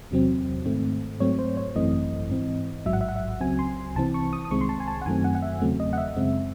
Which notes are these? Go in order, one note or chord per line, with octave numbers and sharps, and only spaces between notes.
E2 C3 F#3 C4
G#2 D#3 A3 C4
G#2 F#3 A3 C4 C#5
C5
C#5
G#1 F#2 E3 A3 C4 D#5
G#2 E3 C4
A1 G#2 F#3 E5
F#5
E5
F#5
E5
C#2 C#3 F#3 C4 G#5
C6
C2 C3 E3 C4 A5
C#6
D#6
D#6
C2 C3 D#3 G#3 C4 C#6
C6
A5
G#5
A5
F#5
F#2 D#3 F#3 A3 C4 G#5
F#5
F#5
E5
E2 C#3 F#3 A3 C4
D#5
F#5
E5
F#2 C#3 G#3 C4